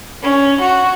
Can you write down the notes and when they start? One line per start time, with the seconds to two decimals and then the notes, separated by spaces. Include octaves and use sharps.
0.23 C#4
0.61 F#4